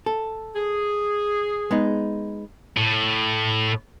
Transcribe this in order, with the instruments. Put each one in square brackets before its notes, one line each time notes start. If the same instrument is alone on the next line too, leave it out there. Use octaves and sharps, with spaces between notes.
[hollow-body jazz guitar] A4
[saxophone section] G#4
[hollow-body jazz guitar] G#3 B3 D#4
[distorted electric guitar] A2